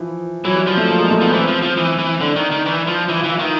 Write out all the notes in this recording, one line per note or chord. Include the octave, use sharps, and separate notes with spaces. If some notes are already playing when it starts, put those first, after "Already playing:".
Already playing: E3 F3
E3 F#3
G3
F3
A3
A#3
G#3
A3
F3 B3
E3 C4
F3
F3
E3
E3
D3 D4
D#3
D#3
E3
F3
E3 E4
F4
E3
F4
D#3 E4